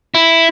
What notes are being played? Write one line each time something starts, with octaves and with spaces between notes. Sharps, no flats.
E4